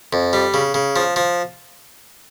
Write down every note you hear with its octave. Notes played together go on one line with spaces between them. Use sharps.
F2
G3
C#3
C#3
F3
F3